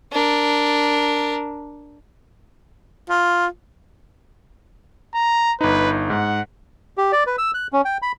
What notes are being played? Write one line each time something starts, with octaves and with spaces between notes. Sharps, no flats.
D4 A#4
F4
A#5
G1 D#4 B4
G#2 F#5
G4
D5
B4
E6
F#6
C#4
G5
B5